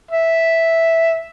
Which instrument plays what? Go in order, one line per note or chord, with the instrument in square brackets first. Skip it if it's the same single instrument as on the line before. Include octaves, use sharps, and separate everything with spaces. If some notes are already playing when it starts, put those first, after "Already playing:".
[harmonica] E5